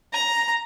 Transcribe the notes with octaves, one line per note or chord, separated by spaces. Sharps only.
A#5